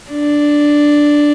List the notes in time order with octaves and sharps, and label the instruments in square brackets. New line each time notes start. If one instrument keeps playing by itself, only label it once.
[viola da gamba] D4